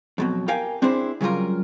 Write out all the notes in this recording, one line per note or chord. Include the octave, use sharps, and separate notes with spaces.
F2 B2 F#3
G4 A#4 F5 G5 G#5
C4 D4 E4 G#4 C5
C#3 F#3 G3 F4 A#4